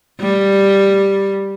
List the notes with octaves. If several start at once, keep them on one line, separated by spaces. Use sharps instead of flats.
G3